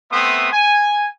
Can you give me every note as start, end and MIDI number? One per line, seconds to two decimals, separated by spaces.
0.12 0.50 57
0.12 0.50 59
0.12 0.50 60
0.12 0.50 76
0.12 0.50 84
0.12 0.50 87
0.52 1.06 80